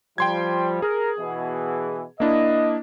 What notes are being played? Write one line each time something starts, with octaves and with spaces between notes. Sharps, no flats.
F3 G3 G5 C6 G#6
G#4 A#4
B2 E3
A#3 D4 E4 D#5